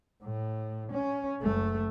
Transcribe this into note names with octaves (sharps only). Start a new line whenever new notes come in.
A2
C#4
F#1 A3